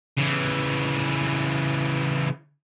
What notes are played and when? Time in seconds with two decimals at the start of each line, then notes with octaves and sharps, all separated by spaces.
0.18 C#3 E3